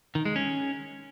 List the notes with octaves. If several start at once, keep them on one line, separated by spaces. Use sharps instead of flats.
D#3
G#3
C#4